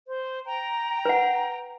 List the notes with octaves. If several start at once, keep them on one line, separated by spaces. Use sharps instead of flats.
C5
G5 A#5
B4 F#5